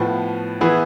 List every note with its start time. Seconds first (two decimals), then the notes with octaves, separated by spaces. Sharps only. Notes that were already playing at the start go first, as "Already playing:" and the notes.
Already playing: A2 F3 B3
0.61 E3 B3 E4 G#4